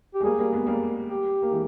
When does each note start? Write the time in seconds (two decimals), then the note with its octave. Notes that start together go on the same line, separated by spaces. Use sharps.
0.15 G4
0.21 G#3
0.24 G3 A#3 G#4
0.39 G3 A#3
0.53 G#3 B3
0.66 G3 A#3
1.09 G4
1.42 A#3
1.51 E3 G#3